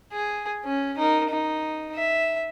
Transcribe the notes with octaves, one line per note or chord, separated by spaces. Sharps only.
G#4
C#4
D#4 A#4
D#4
E5